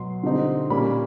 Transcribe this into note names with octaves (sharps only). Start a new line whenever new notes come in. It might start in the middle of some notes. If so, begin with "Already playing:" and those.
Already playing: B2 F#3 C6
D3 G3 C4 D#4
A#2 G3 A#3 C#4 B5